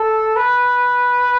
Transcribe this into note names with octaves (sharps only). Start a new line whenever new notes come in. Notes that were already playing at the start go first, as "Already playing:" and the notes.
Already playing: A4
B4